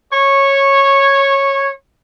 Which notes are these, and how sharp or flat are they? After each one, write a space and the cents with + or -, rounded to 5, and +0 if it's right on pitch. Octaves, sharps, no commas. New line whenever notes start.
C#5 -10